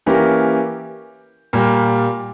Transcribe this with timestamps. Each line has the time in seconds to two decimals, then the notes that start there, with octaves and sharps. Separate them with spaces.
0.06 E3 A#3 C#4 G4 A#4
1.53 A#2 G3 A#3